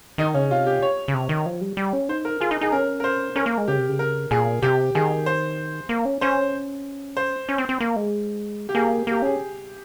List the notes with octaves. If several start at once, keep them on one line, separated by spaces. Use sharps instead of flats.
D#3 D#4
C#3 C#4
C3 F4
G4
C#5
C#3
C3
D#3
F3
G3
G3
C#4
D#4 C5
A#4
F4 G#4
D#4
D#4 G#4
C#4 A#4
A#4
C5
C#4 A#4
A#3
G#3
C#3 G4
C3
C#3
A#4
A#2 G#4
C3 G4
D#3 G#4
C5
A#3
C#4
C#4 C5
C5
C#4
C4
C4
A#3
G#3
G4
A#3 G#4
A#3 G4
C#4 G#4